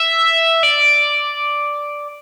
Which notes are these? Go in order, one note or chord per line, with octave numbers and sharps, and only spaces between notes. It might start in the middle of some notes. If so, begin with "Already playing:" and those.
Already playing: E5
D5